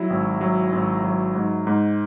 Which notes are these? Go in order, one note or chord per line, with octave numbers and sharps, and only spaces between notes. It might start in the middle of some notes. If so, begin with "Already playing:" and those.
Already playing: F#3 E4
G#1
F#3
G#1
F#3
G#2
G#2